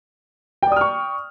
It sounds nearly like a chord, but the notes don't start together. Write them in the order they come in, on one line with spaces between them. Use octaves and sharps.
G5 D5 D#6 F6 C#6